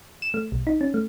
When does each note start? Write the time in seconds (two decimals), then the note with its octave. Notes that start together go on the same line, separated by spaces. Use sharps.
0.22 E7
0.34 A3
0.52 B1
0.67 D#4
0.81 C#4
0.94 A3